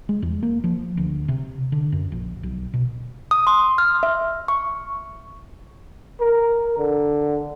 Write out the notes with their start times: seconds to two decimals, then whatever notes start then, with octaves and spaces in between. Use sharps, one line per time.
0.09 G#3
0.22 E2
0.43 A#3
0.64 F3
0.97 D2
1.28 C3
1.72 D3
1.92 F#2
2.12 A#1
2.43 B1
2.74 B2
3.31 D#6
3.47 C6
3.78 F6
4.03 E5
4.48 C#6
6.20 A#4
6.78 D3